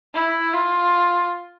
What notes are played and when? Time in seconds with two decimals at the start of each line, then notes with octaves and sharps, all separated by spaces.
0.14 E4
0.53 F4